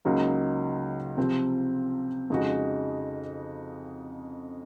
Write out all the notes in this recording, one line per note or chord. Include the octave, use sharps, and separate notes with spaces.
C#2 C#3 F#3 A#3 D#4
C3 F3 C4
F2 C#3 G#3 D#4 F#4